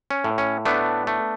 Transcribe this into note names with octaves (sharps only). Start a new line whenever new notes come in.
C#4
A2
C#4
A3 B3 D4
A3